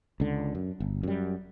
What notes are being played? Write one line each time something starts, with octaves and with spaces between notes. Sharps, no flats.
C#2 D3
F#2
G1
F#2 G3